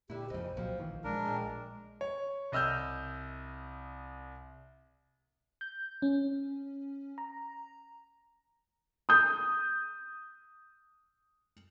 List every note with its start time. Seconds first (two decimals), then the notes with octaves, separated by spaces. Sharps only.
0.10 A#2 D3 E4 G4
0.30 A#1 F2 C#3 D#4 C5
0.57 C2 A#2 F3 F#3
0.79 A1 D#3 E3
1.04 A#1 G#3 D4 A#4
1.25 A#2 F3
2.01 C#5
2.52 C2 D#5 E6 F6 G6
5.61 G6
6.02 C#4
7.18 A#5
9.09 D#6 G6